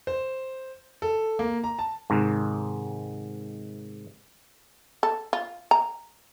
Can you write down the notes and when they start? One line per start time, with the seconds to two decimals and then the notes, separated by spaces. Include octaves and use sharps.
0.07 C5
1.02 A4
1.39 A#3
1.64 A#5
1.79 A5
2.10 G#2 C3 D#3
5.03 A4
5.33 F4
5.71 A#5